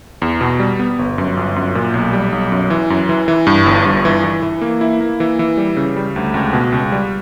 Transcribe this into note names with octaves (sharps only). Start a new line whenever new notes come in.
E2
B2
G3
B3
G1
F#2
G1
F#2
A#2
B1
G3
B1
F#2
E3
F#2
E3
E3
G2
G1
G2
E3
E3
E3
A#3
E4
A#3
E3
E3
G3
C#3
G3
D2
C#2
B2
C#2
G3